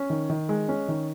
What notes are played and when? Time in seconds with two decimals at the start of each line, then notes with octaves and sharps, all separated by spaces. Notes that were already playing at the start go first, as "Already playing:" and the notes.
Already playing: C#4
0.10 D#3
0.30 D#3
0.49 G#3
0.69 C#4
0.88 D#3